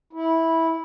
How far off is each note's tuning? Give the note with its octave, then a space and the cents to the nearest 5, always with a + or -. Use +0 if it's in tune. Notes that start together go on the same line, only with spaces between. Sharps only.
E4 -15